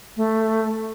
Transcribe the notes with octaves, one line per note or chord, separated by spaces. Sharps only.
A3